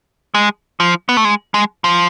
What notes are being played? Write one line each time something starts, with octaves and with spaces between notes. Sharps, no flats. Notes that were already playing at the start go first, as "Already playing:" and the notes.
G#3
F3
B3
A3
G#3
G#3
F3